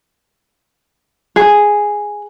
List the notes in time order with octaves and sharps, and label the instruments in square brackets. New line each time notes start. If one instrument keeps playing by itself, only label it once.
[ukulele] G#4